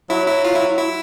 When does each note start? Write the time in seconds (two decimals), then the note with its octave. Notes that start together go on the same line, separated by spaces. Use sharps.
0.10 F#3 E4
0.27 E4
0.44 F4
0.55 E4
0.78 E4